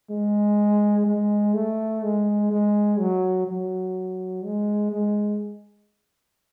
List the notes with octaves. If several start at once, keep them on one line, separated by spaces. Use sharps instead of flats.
G#3
G#3
A3
G#3
G#3
F#3
F#3
G#3
G#3